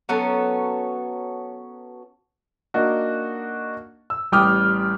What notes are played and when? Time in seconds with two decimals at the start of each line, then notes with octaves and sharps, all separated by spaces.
0.09 F#3 B3 C#4 A4
2.74 A#3 D4 D#4 F#4
4.10 E6
4.32 A1 G3 G5 D6 D#6 F6